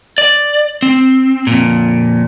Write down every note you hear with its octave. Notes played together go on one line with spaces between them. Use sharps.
D5
C4
F2 A#2